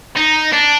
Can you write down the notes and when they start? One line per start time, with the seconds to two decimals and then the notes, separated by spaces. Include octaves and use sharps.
0.17 D#4
0.53 D4